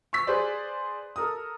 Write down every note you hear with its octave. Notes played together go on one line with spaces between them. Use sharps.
C#6 E6 B6
G#4 B4 C5 D5
A4 A#4 D#6